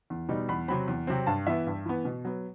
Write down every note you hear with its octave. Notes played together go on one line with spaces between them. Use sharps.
E2
B2 G3 D#4
E2 B5
C3 F#3 C4 B5
E2
C3 F#3 C4
G2 A5
E3 B3 E5
G2
E3 B3
B2
F#3 B3